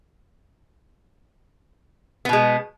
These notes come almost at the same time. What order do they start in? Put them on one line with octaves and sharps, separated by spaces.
B3 B2 G#3